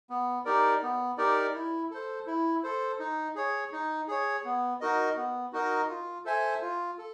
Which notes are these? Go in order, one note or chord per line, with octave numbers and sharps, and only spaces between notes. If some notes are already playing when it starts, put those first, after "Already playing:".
B3
D#4 G4 A#4 D5
B3
D#4 G4 A#4 D5
E4
A4 C5
E4
A4 C5
D#4
G#4 C#5
D#4
G#4 C#5
B3
D#4 F#4 A#4 D#5
B3
D#4 F#4 A#4 D#5
F4
A4 C5 E5 G#5
F4
A4